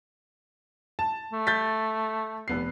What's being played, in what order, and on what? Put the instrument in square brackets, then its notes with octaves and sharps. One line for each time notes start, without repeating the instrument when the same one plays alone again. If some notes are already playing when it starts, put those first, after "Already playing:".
[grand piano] A5
[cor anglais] A3
[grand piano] G6 A6 B6
F1 B3 C7